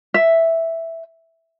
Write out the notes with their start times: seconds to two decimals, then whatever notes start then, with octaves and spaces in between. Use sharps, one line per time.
0.14 E5